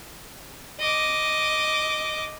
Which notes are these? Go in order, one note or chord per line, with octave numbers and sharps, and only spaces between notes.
D#5 D6